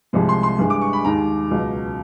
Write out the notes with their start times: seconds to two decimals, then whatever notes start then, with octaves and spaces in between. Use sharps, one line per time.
0.13 C2 C3 F3 G#3
0.29 C6
0.43 C6
0.59 G2 E3 G#3
0.70 D6
0.81 C#6
0.93 B5
1.05 D#2 D#3 G#3 A#5
1.51 C#2 B2 F#3